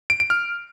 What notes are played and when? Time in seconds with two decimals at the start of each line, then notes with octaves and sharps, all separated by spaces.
0.10 D7
0.20 D7
0.30 F6